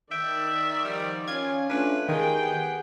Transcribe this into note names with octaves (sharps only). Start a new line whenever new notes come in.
D#3 D5 E5 G5
F3 G3
C#4 F4 G#6
A3 C#4 D4 F4 B4
D#3 G#3 D#4 G4 G#4 G5
B3